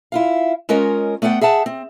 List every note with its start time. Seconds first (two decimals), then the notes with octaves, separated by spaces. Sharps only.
0.12 E4 F4 F5
0.69 G#3 C#4 F4 A#4 C#5 D#5
1.22 A3 B3 D5 F#5 G5
1.41 G#4 E5 F#5 A5
1.66 C4